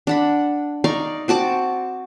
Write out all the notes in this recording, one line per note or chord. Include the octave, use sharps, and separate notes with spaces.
D4 F#5 B5
D#4 D5 F5 C#6
C4 F#4 A5 D6